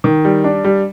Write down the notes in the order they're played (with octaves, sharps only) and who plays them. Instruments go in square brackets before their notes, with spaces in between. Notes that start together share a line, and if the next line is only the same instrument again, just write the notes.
[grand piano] D#3
G3
D4
G3